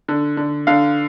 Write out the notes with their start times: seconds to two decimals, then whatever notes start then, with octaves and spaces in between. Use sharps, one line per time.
0.08 D3
0.37 D3
0.67 D3 F5